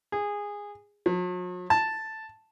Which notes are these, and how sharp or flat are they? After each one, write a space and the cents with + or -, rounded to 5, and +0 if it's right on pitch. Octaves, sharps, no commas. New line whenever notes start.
G#4 -15
F#3 -45
A5 +0